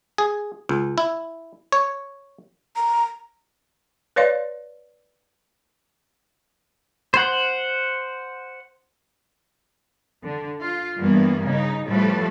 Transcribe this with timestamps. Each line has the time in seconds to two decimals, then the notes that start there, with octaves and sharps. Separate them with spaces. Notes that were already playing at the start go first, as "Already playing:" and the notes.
0.18 G#4
0.69 C#2
0.98 E4
1.72 C#5
2.76 A#5
4.16 B4 C#5 D5 F5 C6
7.14 C5 F#5
10.23 D3
10.60 F4
10.97 G2 E3 A#3 B3
11.46 C#3 D#4
11.87 A2 F3 G3 A3 A4 B4